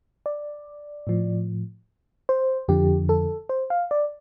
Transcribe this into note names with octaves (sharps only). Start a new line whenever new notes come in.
D5
A2 F3
C5
F2 D3 F3 G4
A4
C5
F5
D5